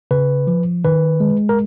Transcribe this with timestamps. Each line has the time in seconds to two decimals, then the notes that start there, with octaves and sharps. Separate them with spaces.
0.11 C#3 B4
0.47 F3
0.84 D#3 B4
1.20 G#3
1.49 A#4